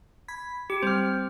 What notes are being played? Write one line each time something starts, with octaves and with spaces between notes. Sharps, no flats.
B5 G#6 B6
G4 C#7 D7
G3 C4 C5 F6